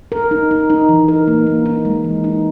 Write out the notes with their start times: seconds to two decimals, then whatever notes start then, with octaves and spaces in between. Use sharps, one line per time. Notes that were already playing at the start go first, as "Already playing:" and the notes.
0.12 A#4
0.31 D#4
0.51 D#4
0.70 D#4
0.89 E3
1.08 A#4
1.27 A#3
1.47 A#3
1.66 D#4
1.85 G#3
2.04 E3
2.24 D#4